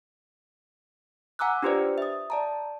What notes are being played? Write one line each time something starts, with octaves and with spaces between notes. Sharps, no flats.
F#5 G#5 A#5 D6 E6 F#6
D4 F4 G4 B4 C5 D5
E5 D#6
D5 A5 A#5